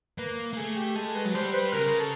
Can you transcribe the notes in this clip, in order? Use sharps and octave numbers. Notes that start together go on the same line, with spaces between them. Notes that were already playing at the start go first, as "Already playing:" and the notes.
A#3 B4
A#3
A3 G#4
G4
G#3 A4
B4
F#3
G3 C5
B4
C#3 A#4
A4